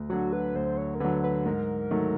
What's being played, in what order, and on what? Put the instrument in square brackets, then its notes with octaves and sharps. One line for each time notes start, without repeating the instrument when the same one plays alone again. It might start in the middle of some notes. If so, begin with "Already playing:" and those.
Already playing: [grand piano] D2
[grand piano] D3 F#3 [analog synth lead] F#4
[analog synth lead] B4
[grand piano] D2 [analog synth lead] C5
[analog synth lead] C#5
A#4
[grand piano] D3 F#3 [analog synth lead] B4
[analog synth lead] B4
[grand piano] G#2 [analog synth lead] A#4
[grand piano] D#3 F#3 A3